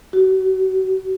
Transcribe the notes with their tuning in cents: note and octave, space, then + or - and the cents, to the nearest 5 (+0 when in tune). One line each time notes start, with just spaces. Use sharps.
F#4 +35